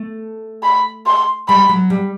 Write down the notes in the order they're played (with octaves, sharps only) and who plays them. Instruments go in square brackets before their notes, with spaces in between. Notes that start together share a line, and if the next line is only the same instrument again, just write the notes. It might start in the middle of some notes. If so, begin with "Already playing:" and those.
Already playing: [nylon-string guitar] A3
[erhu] B5
C6
[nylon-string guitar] G3 [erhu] B5
[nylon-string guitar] F#3
G3